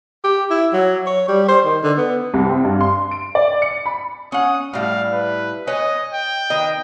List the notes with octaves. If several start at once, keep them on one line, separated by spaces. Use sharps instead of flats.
G4
E4
F#3
C#5
G3
C5
D#3
D3
B3
C2
C4
G2
C6
D7
D5
C#7
B5
C#4 F#5 D#6
A2 G3 E4 F5
B4
B4 C#5 D#5 G#5
G5
D#3 B4 D#5